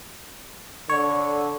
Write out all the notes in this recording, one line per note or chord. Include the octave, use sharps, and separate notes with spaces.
D3 C#5